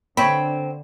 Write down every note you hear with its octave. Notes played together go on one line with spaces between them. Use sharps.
D3 C4 C#5 G5 B5